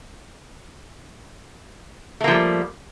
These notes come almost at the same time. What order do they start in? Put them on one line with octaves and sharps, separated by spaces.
A3 A#3 F3 G3